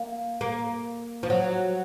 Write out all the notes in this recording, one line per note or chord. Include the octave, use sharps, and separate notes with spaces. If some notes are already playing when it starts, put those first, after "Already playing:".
Already playing: A#3
A#3
F3
F#3